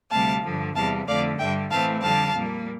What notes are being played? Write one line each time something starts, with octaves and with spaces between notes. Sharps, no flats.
D2 C3 G3 F5 A5
G2 D3 F3
E2 C3 G3 F5 A5
F2 D3 A3 D5 F5
G2 D3 G3 E5 G5
A2 E3 A3 C4 F5 A5
F2 D3 G3 F5 A5
A#2 G3 A#3